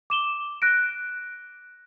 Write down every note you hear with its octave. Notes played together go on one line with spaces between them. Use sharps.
D6 E7 G7
F#6 A#6 D7